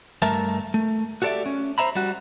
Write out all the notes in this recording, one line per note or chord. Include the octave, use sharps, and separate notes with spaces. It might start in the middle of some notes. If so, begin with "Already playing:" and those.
G2 A3 A#4 E5 A5 A#5
A3
F#4 G4 A4 C#5 D5 E5
C#4
C5 C#5 E5 A#5 B5
G3 F#4